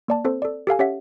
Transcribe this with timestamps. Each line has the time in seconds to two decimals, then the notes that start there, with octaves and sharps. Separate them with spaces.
0.08 A#3 D5 A5
0.25 C4 A4 C5
0.42 A4 D5
0.67 G4 A4 F5 G#5
0.79 C#4 G4 C#5 E5 F#5 B6